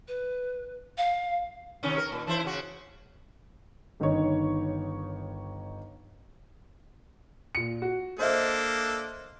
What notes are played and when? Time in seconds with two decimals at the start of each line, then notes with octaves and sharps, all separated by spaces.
0.08 B4
0.97 F5
1.83 C3 D#3 C#4
1.98 A#4
2.12 A#2
2.27 E3 E4 C5
2.44 C#3 F#4
4.00 G1 D#3 D#4 C#5
7.55 A#2 C#7
7.82 F#4
8.19 A#3 D4 A4 C5 D#5 E5